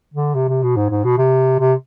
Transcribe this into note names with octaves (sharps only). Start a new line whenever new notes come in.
D3
C3
C3
B2
G#2
G#2
B2
C3
C3